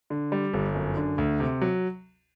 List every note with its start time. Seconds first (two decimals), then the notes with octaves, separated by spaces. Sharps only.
0.10 D3
0.32 G3
0.54 G1
0.75 F#2
0.97 D3
1.18 D2
1.40 C3
1.61 F#3